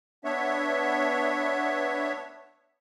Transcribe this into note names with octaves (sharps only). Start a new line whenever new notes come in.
B3 D4 C#5 E5